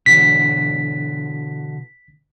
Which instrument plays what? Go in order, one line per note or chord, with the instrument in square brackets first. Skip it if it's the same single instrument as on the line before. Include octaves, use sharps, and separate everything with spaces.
[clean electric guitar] B2 D3 E3 [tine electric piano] B6